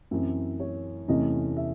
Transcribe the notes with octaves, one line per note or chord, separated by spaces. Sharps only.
F#2 E3 C4
C#5
E2 C3 E3 A3 C#4 D#5
E5